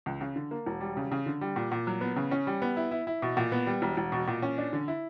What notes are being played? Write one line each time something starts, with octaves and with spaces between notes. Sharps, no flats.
C#2
C#3
D3
A#3
E1
G3
C#3
C#3
D3
G3
A#2
A#2
F#3
B3
C#3
C#4
G3
B3
E4
E4
E4
B2
A#2
B3
G3
E1
E1
B2
A#2
C#4
D4
D3
E4